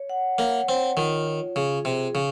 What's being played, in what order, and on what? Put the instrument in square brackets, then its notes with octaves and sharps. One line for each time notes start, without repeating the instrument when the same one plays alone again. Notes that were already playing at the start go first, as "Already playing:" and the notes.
Already playing: [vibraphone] C#5
F#5
[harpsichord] A#3 [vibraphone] C#5
[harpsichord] C4 [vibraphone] C#5
[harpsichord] D#3 [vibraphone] F4
[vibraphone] F4
[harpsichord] C#3 [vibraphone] G#4
[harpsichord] C3 [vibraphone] G#4
[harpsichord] C#3 [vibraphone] D#4